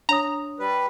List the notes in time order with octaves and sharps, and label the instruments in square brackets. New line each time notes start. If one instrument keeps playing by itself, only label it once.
[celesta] D4 C#5 D#6 [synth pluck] A#5
[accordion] G3 B4